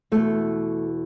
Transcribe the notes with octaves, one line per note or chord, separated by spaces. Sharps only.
E2 B2 A3